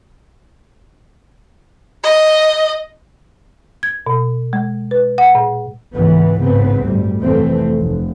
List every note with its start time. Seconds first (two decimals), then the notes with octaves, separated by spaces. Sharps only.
2.04 D#5
3.83 G#6
4.07 B2
4.53 G#3
4.91 B4
5.18 F#5
5.35 A#2
5.94 C#2 G#2 E3 B3
6.39 A1 G#2 C#3 B3 C4
6.82 G1 D2 A2 G3
7.19 F1 F2 E3 A3 C4
7.80 F1